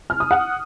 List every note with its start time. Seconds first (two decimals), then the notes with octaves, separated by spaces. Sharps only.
0.10 F6
0.20 D#6
0.31 F#5